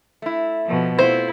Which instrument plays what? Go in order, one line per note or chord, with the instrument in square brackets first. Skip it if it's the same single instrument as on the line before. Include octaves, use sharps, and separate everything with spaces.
[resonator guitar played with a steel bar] A3 E4
[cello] B2 F3
[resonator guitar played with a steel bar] A3 C4 F4 [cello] E4 [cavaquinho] C5